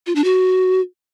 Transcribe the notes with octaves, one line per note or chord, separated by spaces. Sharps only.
F4
D4
F#4